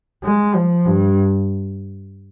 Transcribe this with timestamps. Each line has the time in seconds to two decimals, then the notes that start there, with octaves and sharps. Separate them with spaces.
0.24 G#3
0.55 F3
0.85 G2